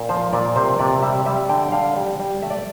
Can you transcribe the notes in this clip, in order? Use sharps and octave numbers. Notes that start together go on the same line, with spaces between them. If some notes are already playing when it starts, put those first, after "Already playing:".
Already playing: A#2
F3 C5
A#2 D5
C3 C5
C3 D5
G3 E5
G3 E5
D3 G5
G5
D3 F5
G3
G3
A3 E5
D5